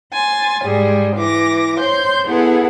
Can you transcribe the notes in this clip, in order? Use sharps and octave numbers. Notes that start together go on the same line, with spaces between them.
G#5 C6 A6
G#2 G3 G#3 G#4
E3 D6 A#6
C5 C#5 C6 G6
B3 E4 G#4 A4 B4 F#5